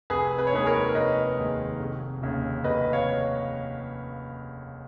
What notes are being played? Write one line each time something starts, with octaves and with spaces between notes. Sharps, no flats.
F1 G#4 B4
B4
C#5
D#2 D#3 G#3 G#4 B4
A#4 C#5
F1 B4 D#5
D#2 D#3 G#3
F1
D#2 C#3
F1 B4 D#5
C#5 F5